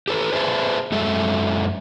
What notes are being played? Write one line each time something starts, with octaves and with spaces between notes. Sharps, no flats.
G4 A4 B4
G#4 B4 C5 E5 G#5 A5
F#2 G#3 A4 E5